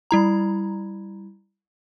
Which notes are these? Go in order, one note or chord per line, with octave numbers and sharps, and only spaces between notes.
G3 E4 A#5